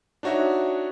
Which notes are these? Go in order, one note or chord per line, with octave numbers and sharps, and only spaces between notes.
D4 D#4 F#4 C#5 E5